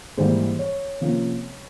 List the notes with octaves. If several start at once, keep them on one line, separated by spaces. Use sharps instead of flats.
G#2 E3 G3 A#3 C5
C#5
C3 F3 A#3 C#4